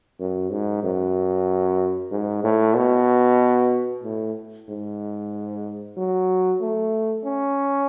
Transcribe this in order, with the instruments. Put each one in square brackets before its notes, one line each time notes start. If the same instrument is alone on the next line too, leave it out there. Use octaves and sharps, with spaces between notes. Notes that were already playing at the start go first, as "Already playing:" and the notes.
[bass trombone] F#2
G#2
F#2
G#2
A2
B2
A2
G#2
F#3
A3
C#4